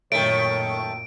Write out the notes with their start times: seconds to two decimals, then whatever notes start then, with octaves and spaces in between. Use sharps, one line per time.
0.12 F#2 A#2 D#3 A3 C#5 D7